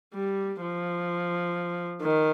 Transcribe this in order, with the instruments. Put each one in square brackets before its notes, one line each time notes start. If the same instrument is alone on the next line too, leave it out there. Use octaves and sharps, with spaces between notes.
[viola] G3
F3
D#3